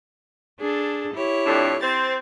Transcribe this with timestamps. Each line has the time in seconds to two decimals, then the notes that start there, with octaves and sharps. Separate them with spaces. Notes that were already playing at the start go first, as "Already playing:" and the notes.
0.60 D4 G#4 A4
1.14 E4 G4 C#5
1.46 F2 A2 D4
1.83 C4 C5 A6